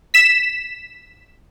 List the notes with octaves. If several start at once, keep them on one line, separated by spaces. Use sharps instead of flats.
B6 E7